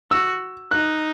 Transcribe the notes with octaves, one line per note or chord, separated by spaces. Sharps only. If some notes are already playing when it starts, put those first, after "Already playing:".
F#4 E6
D#4 F#6